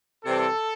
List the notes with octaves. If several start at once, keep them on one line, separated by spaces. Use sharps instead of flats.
C3 E3 G3 C4 A4